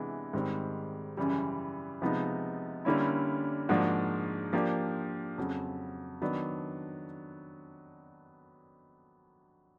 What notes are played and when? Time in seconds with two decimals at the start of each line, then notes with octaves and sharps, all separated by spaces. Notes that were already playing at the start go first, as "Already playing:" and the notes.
Already playing: C3 E3 G#3 B3 D4
0.33 G#2 D#3 G3 C4
1.17 F#2 C#3 E3 G3
2.02 C3 F3 G#3 B3 D#4
2.85 D3 G3 A#3 C#4 E4
3.69 G#2 F3 A#3 D4 F#4
4.53 F3 A#3 D4 G4
5.38 F2 C#3 F#3
6.22 D#3 F#3 B3 D4